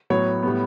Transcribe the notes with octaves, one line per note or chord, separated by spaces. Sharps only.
A2 F#3 B3 C#5
A2 G3 B3